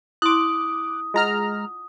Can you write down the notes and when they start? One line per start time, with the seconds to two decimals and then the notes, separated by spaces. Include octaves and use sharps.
0.22 E4 C6 D6 D#6 F#6
1.14 G#3 F4 D#5 F#5 A#5 F6